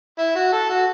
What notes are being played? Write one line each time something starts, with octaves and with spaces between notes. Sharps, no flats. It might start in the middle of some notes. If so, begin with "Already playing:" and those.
E4
F#4
A4
F#4